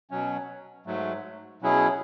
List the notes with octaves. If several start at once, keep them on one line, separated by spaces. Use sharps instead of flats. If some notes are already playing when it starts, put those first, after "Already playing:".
B2 F#3 C#4
G#2 F#3 A3
B2 F#3 C#4 E4 G#4